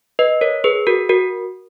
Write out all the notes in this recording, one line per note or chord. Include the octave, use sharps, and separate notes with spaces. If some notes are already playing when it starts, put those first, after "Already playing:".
B4 D#5
A#4 C#5
G#4 B4
F#4 A#4
F#4 A#4